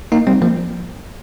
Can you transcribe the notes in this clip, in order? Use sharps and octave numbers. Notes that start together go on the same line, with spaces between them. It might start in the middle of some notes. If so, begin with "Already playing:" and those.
A#3 D#4
G3 C4
F3 A#3